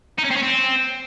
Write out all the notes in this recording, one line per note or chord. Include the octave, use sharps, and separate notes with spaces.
D#4
C#4
C4
C#4
C4